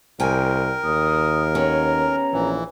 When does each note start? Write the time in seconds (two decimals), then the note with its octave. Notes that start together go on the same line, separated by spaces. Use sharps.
0.20 C2 A#4 G5 G#5
0.84 D#2 D#6
1.55 B3 C#4 G#4 A#5
2.33 A#1 E3